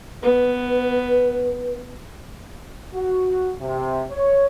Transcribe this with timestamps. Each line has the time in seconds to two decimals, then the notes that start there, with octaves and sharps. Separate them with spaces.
0.23 B3 B4
2.94 F#4
3.60 C3
4.10 C#5